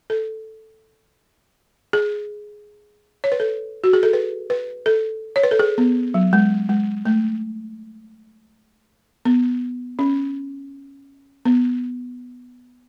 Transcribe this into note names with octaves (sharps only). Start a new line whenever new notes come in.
A4
G#4
C#5
B4
A4
F#4
G#4
A4
B4
B4
A4
C#5
B4
A4
G#4
B3
F#3
G#3
G#3
A3
B3
C#4
B3